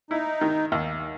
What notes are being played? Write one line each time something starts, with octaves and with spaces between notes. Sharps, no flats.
D#4 E4
D#3
D#2